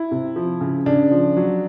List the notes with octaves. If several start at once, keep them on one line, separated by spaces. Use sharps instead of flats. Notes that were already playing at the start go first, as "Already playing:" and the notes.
Already playing: E4
C3
F3
C#3
C#3 D4
F3
F#3